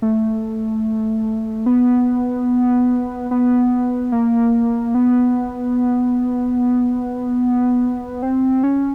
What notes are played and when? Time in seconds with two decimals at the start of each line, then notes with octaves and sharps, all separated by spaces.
0.02 A3
1.66 B3
3.31 B3
4.12 A#3
4.95 B3
8.22 C4
8.64 C#4